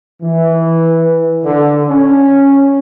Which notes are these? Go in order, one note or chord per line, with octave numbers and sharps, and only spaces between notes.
E3
D3
C#4